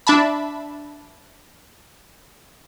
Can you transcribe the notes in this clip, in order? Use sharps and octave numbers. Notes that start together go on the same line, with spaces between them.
D4 E5 A5 B5